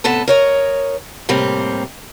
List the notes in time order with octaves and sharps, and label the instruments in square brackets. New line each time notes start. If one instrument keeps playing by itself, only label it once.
[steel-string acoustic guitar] A2 C3 B3 A4 A5
A#4 C#5 D#5
A2 C3 G3 A#3 C4